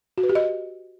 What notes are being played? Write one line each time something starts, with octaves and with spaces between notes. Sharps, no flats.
F#4
B4
G4
D#5